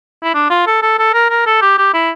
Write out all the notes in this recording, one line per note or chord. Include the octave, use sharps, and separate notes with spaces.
E4
D4
F4
A4
A4
A4
A#4
A#4
A4
G4
G4
E4